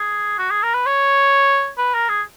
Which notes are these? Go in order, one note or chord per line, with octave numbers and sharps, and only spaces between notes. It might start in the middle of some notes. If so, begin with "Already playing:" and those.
Already playing: G#4
F#4
G#4
A#4
B4
C#5
B4
A#4
G#4